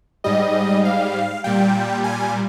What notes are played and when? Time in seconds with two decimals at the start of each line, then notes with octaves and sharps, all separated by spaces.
0.24 G#2 G3 D#5
0.85 F5
1.44 A#2 G3 G5
2.04 G#5